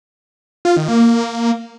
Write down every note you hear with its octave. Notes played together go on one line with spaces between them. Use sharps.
F4
D#3
A#3
A#3